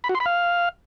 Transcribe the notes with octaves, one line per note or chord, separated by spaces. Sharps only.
B5
F#4
C6
B5
F5